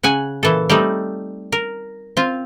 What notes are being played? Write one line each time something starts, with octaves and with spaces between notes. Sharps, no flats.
C#3 F#5 G#5
A#2 E3 A4
G3 A3 C4 D#4
A#4
C4 F4